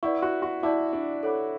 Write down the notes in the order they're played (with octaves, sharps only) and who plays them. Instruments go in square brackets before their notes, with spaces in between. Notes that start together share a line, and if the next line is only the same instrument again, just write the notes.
[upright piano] E4 [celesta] B4 D5 F#5 C#6
[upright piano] F#4
F#4
[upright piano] E4 [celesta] G4 D5 F#5 A5 D6
[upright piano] D4
[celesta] A4 C#5 F#5 B5 D6